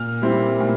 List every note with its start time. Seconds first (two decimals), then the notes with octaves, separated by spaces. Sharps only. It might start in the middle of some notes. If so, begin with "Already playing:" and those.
Already playing: A#2 F6
0.22 G3 C4 E4
0.60 A#2